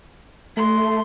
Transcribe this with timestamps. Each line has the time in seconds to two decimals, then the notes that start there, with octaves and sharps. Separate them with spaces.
0.57 A3 C6